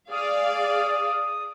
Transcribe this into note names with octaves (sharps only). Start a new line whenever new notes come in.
G#4 D5 F5 D#6